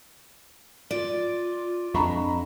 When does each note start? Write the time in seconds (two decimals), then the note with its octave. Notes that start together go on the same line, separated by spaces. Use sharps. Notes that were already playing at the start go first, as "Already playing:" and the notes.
0.91 F4 D5
1.94 F2 D4 A#5 B5 C#6